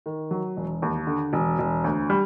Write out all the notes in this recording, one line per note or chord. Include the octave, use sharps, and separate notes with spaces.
D#3
F#3
E1
D#2
D3
E1
E1
D2
G3